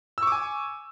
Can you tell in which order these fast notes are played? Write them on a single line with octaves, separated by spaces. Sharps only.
E6 C#6 D6 G#5